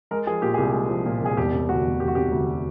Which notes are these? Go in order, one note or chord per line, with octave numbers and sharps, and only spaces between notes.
G#3 A#4
F3 G#4
A#2 G4
G#4
C2 G4
G#3
F3
A#2
C2 G#4
E1 G4
C3
D2 F#4
E1
E1 G4
F#4
C3 G4
D2